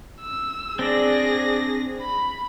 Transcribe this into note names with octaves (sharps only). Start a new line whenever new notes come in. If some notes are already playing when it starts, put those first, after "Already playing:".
E6
C4 D4 G#4 D5 A#6
B5